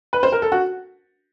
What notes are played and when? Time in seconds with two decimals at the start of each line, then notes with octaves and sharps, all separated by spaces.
0.13 B4
0.23 C5
0.32 A#4
0.42 A4
0.52 F#4